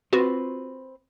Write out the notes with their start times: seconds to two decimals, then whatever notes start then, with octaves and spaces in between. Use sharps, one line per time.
0.13 C4 F4 F#4 B4